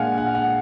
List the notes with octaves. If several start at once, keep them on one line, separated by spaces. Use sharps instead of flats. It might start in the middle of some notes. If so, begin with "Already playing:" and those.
Already playing: A#2 G#3 D4 F5 F#5 G#5
F#5
F#5